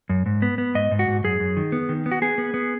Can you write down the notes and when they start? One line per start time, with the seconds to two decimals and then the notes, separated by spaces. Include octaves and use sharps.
0.10 F#2
0.26 G#2
0.42 B3
0.58 B3
0.75 G#2 D#5
0.91 G#2
0.99 F#4
1.08 G#2
1.24 F#2 G#4
1.40 F#2
1.57 D#3
1.72 B3
1.89 D#3
2.06 B3
2.12 F#4
2.22 B3 G#4
2.38 B3
2.54 B3